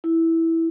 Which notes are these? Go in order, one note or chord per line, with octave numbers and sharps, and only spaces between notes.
E4